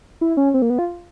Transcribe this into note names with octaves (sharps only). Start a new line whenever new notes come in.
E4
C#4
C4
A#3
B3
F4